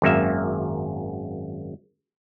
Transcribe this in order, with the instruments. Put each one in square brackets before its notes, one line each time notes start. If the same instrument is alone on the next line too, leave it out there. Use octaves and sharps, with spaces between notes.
[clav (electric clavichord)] G#1 F#2 A#3 E5